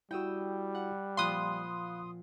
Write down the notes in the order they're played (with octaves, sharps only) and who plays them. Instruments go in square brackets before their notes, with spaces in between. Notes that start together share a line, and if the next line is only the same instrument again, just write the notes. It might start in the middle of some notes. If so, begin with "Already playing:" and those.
[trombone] G3 [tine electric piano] E4 F#4 [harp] G5 D#6 E6
[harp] F#5
[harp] A#2 F3 [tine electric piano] F5 B5 F#6 [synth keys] C6 D#6